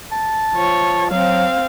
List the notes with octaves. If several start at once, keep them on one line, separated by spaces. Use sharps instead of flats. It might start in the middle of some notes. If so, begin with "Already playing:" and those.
A5
F3 C#5
F#3 C4 F5